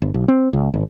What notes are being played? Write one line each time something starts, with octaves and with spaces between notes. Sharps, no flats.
G1
B1
C4
C#2
G#1